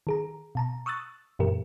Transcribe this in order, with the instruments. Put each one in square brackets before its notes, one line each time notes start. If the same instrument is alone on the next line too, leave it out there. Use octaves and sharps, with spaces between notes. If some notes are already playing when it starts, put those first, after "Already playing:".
[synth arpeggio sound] D#3 G#4 A#5
B2 A5 A#5
C#6 D#6 E6 F#6 A6
F#2 A#2 E3 G4 A#4